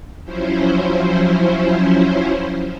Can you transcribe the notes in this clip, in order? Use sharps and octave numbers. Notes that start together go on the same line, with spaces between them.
F3 F#3 C#4 E4 C5